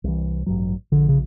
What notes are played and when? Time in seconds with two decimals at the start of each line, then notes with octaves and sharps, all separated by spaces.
0.04 C2 E3
0.46 A1 G2 F#3
0.92 A#1 D3
1.09 C#3